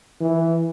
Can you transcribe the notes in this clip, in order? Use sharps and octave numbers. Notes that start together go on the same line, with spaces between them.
E3